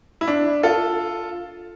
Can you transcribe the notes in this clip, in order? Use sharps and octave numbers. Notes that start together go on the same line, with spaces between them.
E4
D4
F4 A4